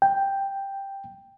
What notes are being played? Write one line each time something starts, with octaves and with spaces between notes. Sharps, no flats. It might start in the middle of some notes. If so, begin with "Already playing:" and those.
G5